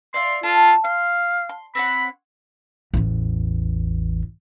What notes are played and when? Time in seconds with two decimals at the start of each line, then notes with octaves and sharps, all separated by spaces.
0.14 D5 E5 F5 C6
0.43 F4 A4
0.85 F5 C6
1.49 C6
1.75 C4 C#5 F#5 B5
2.94 A1 E2